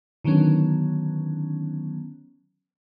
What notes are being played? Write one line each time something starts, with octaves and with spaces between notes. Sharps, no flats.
D3 D#3 F#3 B3 C#4